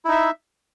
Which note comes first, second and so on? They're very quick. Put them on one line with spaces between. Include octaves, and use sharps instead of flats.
E4 D#4 E5